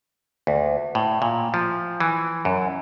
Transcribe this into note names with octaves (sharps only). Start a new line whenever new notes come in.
D2
A2
A#2
F3
E3
F#2